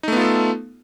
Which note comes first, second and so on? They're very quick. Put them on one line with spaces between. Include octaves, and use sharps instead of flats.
D#4 A3 B3 F4 A4